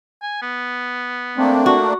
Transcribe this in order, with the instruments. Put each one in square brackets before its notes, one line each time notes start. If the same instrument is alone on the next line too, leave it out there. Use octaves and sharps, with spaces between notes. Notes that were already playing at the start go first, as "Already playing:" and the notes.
[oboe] G#5
B3
[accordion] A3 A#3 D4 [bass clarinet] C4
[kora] F#4